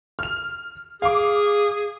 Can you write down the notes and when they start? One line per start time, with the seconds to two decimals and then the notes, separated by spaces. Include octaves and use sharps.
0.19 F6 F7
1.02 G#4 F5 D6